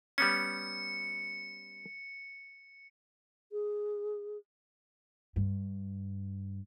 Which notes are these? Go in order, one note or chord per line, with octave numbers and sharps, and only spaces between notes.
G3 B3 C#4 C#7
G#4
G2